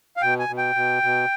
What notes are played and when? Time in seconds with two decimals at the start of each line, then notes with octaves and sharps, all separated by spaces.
0.17 F5
0.22 B2 G5
0.39 G#5
0.49 B2
0.58 G5
0.75 B2
1.03 B2